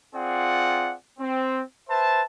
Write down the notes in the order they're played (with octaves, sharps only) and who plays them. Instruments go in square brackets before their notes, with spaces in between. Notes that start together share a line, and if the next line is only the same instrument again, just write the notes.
[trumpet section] C4 F4 G#4 D5 F#5
C4
B4 C5 E5 A5